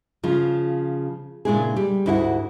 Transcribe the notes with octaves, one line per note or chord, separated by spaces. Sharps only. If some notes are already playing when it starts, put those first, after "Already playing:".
C#3 F3 F4
A#2 C#3 G#3 D4 E4 G#4
G3
D2 G#2 E4 F#4 F5 F#5